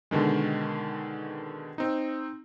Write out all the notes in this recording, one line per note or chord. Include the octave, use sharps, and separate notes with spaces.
B2 D3 D#3 G#3
C4 D#4